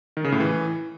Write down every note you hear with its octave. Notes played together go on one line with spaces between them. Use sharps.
D#3
C#3
A2
E3